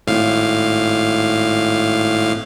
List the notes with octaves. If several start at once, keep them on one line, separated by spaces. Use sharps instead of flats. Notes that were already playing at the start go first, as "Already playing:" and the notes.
G#1 A2 F5